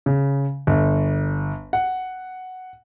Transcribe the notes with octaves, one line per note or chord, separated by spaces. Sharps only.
C#3
G1
F#5